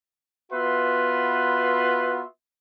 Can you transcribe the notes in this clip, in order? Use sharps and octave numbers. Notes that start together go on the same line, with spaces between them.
B3 F4 F#4 B4 E5 C6